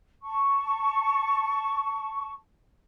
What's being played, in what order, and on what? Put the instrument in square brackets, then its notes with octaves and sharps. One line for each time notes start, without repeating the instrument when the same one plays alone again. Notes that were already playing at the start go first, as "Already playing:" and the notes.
[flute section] A5 C#6